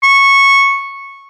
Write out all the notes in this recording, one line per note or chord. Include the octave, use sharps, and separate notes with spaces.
C#6